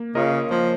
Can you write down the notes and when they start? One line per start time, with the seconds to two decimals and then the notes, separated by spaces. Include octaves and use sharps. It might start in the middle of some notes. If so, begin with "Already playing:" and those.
Already playing: A#3
0.15 C#3 F4 A#4 D#5
0.51 F3 A#3